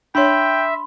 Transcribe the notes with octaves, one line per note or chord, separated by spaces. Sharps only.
D4 C#5 E5 G5 B5 C6